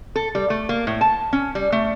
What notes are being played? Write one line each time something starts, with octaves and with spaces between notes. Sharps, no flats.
A4
G3
A3
A#3
A2
A5
C#4
G3
A3